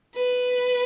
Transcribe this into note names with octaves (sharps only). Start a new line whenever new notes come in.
B4